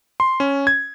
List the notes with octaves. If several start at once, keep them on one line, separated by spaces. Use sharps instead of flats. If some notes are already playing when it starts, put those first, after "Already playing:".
C6
C#4
G#6